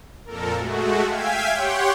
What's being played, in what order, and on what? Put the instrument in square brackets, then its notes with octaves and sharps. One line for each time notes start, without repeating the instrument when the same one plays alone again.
[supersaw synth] F2 A#2 A4 A#4
G#3 A3 F#4
E5 F5 G5 G#5 G#6 B6
G4 C#5 F#5 G5 C6